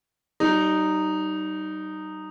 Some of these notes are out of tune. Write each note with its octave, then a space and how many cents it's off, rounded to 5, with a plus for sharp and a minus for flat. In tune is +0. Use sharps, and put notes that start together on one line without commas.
G3 -35 D#4 -10